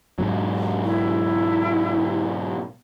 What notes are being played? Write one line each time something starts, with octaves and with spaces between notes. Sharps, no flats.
G#2 B2 F#3
E4